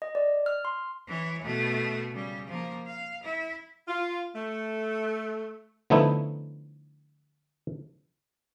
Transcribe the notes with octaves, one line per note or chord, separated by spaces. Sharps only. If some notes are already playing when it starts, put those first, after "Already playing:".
D#5
D5
F6
C6
E3 C#5
B2 A3
C#3 G3
F3 A#3
F5
E4
F4
A3
D3 F3 A3 B3 D#4 E4